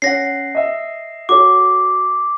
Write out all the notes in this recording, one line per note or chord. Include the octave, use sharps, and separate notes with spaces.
C#4 C#5 F#5 A#6 C7
D#5 E5
F#4 A4 C#5 D6